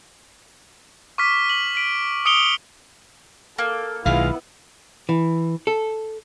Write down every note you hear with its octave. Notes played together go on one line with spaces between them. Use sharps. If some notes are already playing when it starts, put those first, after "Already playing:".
C#6 D6 F6 B6
F#7
B6 D7
D#6 C#7 D7 F7 G7
A#3 A4
B1 D#3 G#3 B3 E4 F4 F5
E3
A4